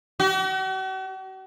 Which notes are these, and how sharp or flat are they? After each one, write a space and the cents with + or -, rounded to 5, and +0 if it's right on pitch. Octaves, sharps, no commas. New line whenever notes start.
F#4 +45